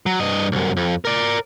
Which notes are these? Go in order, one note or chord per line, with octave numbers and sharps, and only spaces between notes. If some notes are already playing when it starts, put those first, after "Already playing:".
F#3
G2 D#5
C2 F#2
F2
A#4 D5